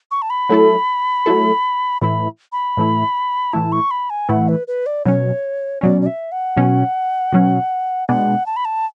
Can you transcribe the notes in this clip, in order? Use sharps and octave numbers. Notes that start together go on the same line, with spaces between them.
C#6
A5
B5
F#3 A3 E4 A4
F#3 A3 E4 A4
A2 E3 A3 E4 B5
B5
A2 E3 A3 E4
A2 E3 A3 E4 A5
C#6
B5
G#5
A2 E3 A3 E4 F#5
B4
B4
D5
B2 F#3 C#4 C#5
B2 F#3 C#4 D5
D5
E5
F#5
B2 F#3 C#4
B2 F#3 C#4
B2 G#3 B3 D4 F#5
A5
B5
A5